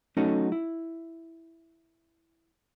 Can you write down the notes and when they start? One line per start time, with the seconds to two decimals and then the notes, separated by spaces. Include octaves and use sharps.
0.17 F#3 A3 C#4 D#4 F#4 A4
0.52 E4